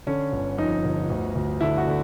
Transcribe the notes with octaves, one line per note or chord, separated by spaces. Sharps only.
D3 C#4
G1
F2 D#4
G1
D2
D2
D3 E4
F#4
D3